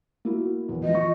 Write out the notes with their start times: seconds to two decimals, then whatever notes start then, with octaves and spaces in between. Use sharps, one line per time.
0.25 A#3 E4 F#4
0.69 E2
0.84 E3 F3 D#5
0.95 C#6